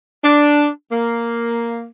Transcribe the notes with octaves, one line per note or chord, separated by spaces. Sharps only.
D4
A#3